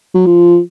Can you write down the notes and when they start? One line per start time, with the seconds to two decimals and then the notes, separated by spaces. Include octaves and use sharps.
0.14 F#3
0.26 F3